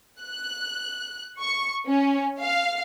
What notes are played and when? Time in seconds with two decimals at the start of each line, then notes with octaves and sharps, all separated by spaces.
0.21 F#6
1.39 C#6
1.86 C#4
2.41 F5